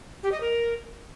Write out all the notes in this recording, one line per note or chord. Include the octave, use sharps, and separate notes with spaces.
G4
D#5
A#4